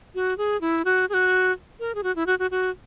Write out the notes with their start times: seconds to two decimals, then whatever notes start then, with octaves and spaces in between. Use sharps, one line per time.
0.15 F#4
0.38 G#4
0.61 E4
0.85 F#4
1.09 G#4
1.14 F#4
1.80 A#4
1.95 G#4
2.03 F#4
2.16 E4
2.27 F#4
2.39 F#4
2.51 F#4